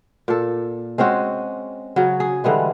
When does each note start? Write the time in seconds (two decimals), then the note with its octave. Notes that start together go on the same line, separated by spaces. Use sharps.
0.28 A#2 A4
0.98 G#3 C4 C#4 F#4
1.96 C#3 F#3
2.20 G#4
2.44 D3 E3 G3 G#3